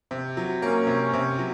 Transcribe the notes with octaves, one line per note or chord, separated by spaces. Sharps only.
C3
F#3
A#3 C#4
C3
C#4
C3
F#3